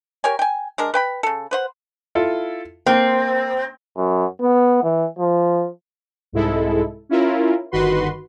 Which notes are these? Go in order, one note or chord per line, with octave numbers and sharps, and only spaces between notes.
G4 A#4 C#5 G#5
G5 G#5
G#3 D4 A#4
B4 G5 B5
C#3 A4
B4 C5 F#5
E4 F4 A4
A#3 C4
F#2
B3
E3
F3
C2 G#2 G#3 E4 A4
C#4 E4 F4 A#4
G1 D#3 F#4 B4 C6